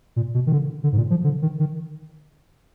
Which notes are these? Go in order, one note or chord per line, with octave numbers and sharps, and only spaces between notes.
A#2
B2
D#3
D3
D3
G#2
A#2
F3
D3
D#3
D#3